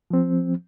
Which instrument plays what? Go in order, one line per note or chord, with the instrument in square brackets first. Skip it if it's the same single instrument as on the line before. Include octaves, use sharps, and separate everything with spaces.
[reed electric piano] F3 C4